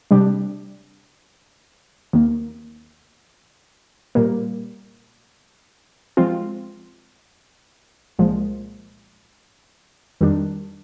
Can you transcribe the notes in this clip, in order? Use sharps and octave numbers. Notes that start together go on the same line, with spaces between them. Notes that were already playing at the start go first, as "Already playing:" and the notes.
C3 G3 D4 G4
D#2 D#3 A#3
A#2 G3 A#3
F3 G#3 C4 F4
C2 A#2 F3 G#3
F2 D#3 G3 D4